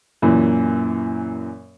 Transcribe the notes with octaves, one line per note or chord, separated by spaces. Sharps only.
F#2 A#2 E3